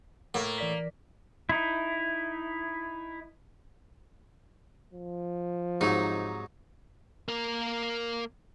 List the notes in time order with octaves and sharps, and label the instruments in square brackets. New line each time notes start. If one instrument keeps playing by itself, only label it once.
[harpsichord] A2 [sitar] A#3
[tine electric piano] E3 D5 B6
[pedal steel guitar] D#4 E4
[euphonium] F3
[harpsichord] G#2 C3 F#3 [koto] D#4
[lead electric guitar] A#3 A#4